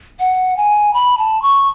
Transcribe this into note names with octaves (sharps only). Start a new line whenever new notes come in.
F#5
G#5
B5
A5
C#6